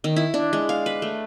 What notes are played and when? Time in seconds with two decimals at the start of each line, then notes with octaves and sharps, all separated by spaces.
0.04 D#3
0.16 E4
0.34 D4
0.53 G#3
0.69 F5
0.86 B4
1.02 A3